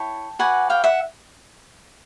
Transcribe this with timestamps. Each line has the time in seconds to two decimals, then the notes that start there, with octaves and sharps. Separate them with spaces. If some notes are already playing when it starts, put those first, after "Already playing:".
Already playing: E4 C#5 G5 A5
0.39 F#4 B4 D5 F#5 G#5
0.70 F5 G5
0.84 E5 F#5